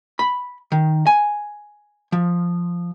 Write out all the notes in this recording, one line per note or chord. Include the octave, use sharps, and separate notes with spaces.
B5
D#3
G#5
F3